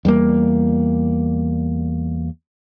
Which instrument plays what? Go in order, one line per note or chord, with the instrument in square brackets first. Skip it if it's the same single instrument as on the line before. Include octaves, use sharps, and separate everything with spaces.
[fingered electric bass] E2 G3 A#3